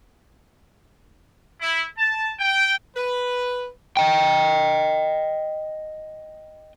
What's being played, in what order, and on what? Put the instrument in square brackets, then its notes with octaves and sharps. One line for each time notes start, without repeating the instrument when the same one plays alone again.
[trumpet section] E4
A5
G5
[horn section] B4
[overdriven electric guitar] D#5 G5